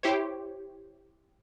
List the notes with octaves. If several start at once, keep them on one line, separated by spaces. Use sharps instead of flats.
E4 G4 C5 C#5